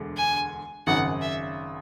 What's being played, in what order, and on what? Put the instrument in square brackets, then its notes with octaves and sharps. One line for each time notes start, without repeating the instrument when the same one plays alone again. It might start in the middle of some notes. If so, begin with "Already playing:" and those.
Already playing: [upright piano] E1 D2 D3 G#3
[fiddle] G#5
[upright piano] G#1 F#2 C#3 [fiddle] F#5
[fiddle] E5